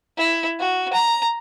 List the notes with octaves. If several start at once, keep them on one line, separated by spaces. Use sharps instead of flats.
E4
F#4
A#5